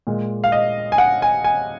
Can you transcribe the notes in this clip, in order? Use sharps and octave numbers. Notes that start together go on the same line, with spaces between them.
A#2 G#3
F5
D#5
G#5
F#5
G#5
G#5